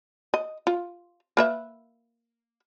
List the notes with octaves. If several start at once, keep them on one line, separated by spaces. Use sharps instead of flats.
D#5
F4
A#3 B4 E5